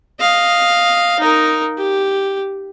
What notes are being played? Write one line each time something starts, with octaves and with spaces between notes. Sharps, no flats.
D#5 F5
D#4 A#4
G4